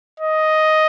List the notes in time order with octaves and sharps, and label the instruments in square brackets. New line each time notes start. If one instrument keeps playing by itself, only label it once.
[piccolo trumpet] D#5